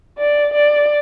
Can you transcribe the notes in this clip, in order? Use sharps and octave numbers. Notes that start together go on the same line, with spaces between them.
D5
D5